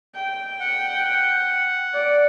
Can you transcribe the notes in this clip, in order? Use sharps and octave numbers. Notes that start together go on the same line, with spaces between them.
G5
F#5
D5